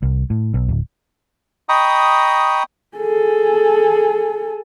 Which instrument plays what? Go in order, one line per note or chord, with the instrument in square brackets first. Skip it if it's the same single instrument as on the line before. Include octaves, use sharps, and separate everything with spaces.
[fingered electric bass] C2
A2
B1
D1
[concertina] D#5 G5 A#5 B5 C#6 D#6
[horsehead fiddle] G#4 A4